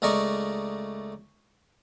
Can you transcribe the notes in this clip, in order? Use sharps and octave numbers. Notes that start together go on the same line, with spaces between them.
C#2 A3 A#4 D5 D#5 C#6